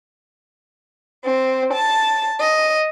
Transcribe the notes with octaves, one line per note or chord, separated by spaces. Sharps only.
C4
A5
D#5